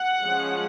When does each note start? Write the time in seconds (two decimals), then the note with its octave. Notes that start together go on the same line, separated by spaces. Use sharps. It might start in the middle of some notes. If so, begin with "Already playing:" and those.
Already playing: F#5
0.21 F3 G#3 C#4